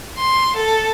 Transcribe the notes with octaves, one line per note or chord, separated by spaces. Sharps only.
C6
A4